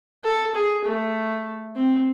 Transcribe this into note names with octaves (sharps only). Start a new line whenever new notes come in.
A4
G#4
A3
C4